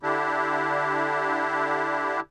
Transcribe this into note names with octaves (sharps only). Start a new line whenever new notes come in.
D3 D4 E4 G4